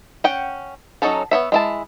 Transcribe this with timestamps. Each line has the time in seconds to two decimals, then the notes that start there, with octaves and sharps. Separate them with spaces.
0.24 C#4 F#5 G5
1.02 F#3 C#4 D#4 A4 C#5
1.31 B3 C#5 E5
1.52 G#3 E4 A5